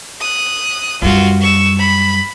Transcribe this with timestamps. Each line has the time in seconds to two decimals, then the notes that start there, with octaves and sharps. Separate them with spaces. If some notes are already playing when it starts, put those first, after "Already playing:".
0.20 D#6 F#6
1.02 F#2 G3 F4 F#4
1.41 C#6 E6
1.78 B5